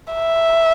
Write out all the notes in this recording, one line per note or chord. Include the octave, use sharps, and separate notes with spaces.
E5